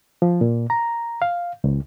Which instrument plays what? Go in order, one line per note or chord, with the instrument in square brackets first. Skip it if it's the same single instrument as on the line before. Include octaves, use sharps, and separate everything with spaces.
[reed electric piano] F3
A#2
A#5
F5
C#2